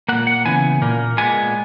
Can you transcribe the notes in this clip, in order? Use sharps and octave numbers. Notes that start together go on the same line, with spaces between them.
A#2 A#3 F#5
F#5
C#3 E3 B3 G#5
A#2 A#3
A#2 G#3 B3 G#5